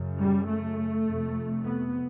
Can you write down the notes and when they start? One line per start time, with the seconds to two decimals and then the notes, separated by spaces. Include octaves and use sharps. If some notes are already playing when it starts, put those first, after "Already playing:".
Already playing: F#2 C#3
0.18 G3
0.47 A3
1.05 F2 C3
1.63 B3